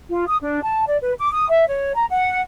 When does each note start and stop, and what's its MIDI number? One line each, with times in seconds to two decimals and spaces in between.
0.10 0.27 65
0.28 0.37 87
0.41 0.62 62
0.62 0.84 81
0.87 0.97 74
1.02 1.12 71
1.18 1.32 86
1.32 1.48 87
1.49 1.67 76
1.68 1.95 73
1.95 2.06 82
2.10 2.41 78